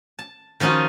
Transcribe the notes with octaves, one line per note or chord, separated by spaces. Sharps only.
A5
D#3 F3 C#4 D#4 F4 F#4